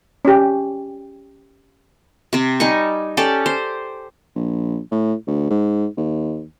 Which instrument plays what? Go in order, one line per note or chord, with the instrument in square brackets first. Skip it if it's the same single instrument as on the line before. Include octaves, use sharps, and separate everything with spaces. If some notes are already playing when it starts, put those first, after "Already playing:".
[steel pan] C#4 G4
[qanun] C3 C4
G3 D#4 G#5 C#6
C#4 G4 A4 D5
C5
[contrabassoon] A#1
A2
D2
G#2
D#2